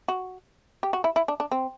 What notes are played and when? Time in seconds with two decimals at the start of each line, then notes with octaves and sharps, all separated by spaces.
0.08 F#4
0.83 G4
0.93 F#4
1.04 E4
1.16 E4
1.28 D4
1.40 D4
1.51 C4